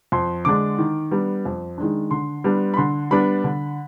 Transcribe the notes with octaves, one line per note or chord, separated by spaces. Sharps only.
F2 C6
D3 G#3 D4 D6
D#3
G3 B3 D4
F2
D#3 G#3 D4
D3 C6
G3 B3 D4
B5
D3 C6
G3 B3 D4 B5
D3